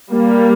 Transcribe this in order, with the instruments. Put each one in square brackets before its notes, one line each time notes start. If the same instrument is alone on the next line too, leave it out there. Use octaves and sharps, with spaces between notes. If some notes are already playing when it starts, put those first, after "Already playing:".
[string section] G3 A#3